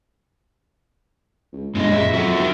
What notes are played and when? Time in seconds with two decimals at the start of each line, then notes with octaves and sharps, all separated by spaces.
1.53 C#2
1.75 G1 F#2 A#2 G#3 D#5
1.93 C#3 E5
2.14 F2 F#3 F#4 E5 F#5
2.38 D#2 A#4 G5